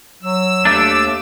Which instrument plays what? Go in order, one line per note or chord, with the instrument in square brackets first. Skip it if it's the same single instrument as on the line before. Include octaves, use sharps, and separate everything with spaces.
[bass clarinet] F#3 [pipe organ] E6
[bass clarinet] D#2 [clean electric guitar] A3 D4 [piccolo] D6